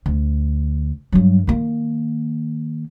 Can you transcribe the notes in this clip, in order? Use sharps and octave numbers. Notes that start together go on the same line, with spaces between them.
D2
G2 F#3
D#3 A#3